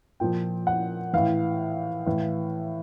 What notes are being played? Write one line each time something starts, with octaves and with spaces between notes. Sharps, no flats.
A#2 F3 G5
F#5
A2 E3 F5
A2 E3